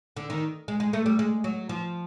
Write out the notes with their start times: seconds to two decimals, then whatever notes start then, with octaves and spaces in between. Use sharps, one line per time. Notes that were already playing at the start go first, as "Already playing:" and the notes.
0.16 D3
0.30 D#3
0.68 G#3
0.80 G#3
0.93 A3
1.06 G3
1.19 G#3
1.44 F#3
1.69 F3